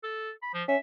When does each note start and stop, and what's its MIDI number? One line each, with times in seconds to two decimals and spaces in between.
0.03 0.31 69
0.42 0.50 83
0.54 0.63 53
0.68 0.76 61
0.68 0.78 76